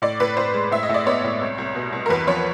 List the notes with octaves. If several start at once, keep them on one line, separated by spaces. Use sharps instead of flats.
A2 D5
A2 B4
A2 C5
G#3
A2 E5
D#5
A2
D5
B3 C#5
A2
C2
C2
B2
C2
A#4
E2 B4
F3 C#5